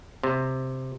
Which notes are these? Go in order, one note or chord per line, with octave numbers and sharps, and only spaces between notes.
C3